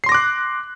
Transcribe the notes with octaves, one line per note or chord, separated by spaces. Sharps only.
C6 D6 F#6 A#6 C7